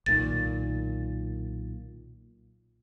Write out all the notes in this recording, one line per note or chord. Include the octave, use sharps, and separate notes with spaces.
B1 A#2 D#3 A6